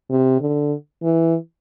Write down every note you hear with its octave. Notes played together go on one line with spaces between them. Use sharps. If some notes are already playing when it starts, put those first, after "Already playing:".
C3
D3
E3